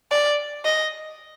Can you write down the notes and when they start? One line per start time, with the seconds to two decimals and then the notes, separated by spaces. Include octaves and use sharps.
0.11 D5
0.64 D#5